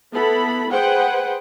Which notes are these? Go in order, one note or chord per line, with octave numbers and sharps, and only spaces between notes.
B3 E4 A4 B5
G#4 B4 C5 F#5 G5